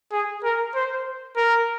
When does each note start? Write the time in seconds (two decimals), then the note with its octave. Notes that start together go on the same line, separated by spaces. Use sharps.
0.12 G#4
0.44 A#4
0.75 C5
1.36 A#4